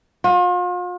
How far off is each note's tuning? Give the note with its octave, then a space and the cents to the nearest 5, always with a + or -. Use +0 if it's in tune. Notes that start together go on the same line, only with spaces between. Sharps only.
F4 +40